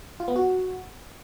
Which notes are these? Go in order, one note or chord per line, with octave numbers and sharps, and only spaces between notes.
F4
B3
F#4